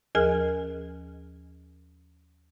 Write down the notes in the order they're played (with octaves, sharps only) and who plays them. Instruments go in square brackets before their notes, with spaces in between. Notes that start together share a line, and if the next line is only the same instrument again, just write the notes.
[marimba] D#2 F3 G#4 A#4 G#5 F6